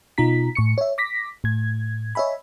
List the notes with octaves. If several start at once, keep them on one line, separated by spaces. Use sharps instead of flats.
B2 D#4 F4 A#5 B6
A2 C#6 C#7
C#5 E5
D6 A#6 B6
A2 G#6
C#5 D#5 E5 G#5 B5